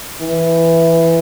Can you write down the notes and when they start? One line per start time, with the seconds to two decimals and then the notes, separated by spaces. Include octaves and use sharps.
0.21 E3